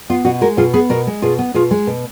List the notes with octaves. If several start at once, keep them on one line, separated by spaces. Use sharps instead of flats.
B3 F4
B2 F#4
G#3 F#4 A#4
B2 F4 G#4
B3 G#4 B4
B2 F#4 A#4
G#3
B2 F4 G#4
B3
B2 F4 G#4
G#3
B2